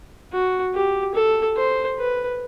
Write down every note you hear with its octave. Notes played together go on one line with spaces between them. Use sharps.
F#4
G4
A4
C5
B4